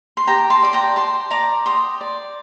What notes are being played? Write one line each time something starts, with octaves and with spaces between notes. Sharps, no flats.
C6
G4 G5 A#5
A5 C6
D5 C6
G5 A#5
G4 A5 C6
D5 A#5 D6
G4 C6 D#6
D5